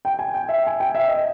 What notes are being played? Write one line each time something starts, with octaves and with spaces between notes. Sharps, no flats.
G5
G#5
G5
E5
G#5
G5
E5
D#5